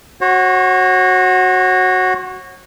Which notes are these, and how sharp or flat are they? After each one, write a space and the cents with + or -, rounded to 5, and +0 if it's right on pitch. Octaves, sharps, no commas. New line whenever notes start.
F#4 +0 C#5 -40